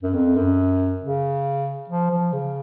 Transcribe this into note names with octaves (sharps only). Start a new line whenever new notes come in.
F#2
F2
F#2
C#3
F3
F3
C#3